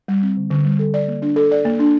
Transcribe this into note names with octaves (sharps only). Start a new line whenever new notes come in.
G3
C4
D3
D3
G3
A4
D5
A#3
D4
A4
D5
A#3
D4